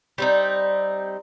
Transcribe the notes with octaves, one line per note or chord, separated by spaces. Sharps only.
G3 C4 D#4